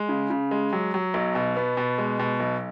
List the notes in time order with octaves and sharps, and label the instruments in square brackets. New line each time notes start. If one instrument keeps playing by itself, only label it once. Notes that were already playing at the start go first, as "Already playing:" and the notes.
Already playing: [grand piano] G#3
C#3
C#3
G#3
F#3
F#3
B1
B2
B3
B2
G#3
B2
B1